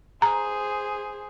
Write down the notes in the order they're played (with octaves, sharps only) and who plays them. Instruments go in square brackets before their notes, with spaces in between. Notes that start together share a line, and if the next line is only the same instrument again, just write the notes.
[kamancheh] G#4 C5 [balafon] A#5